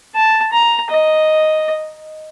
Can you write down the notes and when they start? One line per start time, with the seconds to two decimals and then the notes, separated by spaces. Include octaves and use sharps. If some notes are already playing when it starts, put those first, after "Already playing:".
0.15 A5
0.53 A#5
0.90 D#5